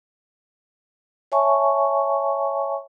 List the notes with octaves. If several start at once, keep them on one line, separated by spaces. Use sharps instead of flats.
C#5 E5 G#5 A5 C#6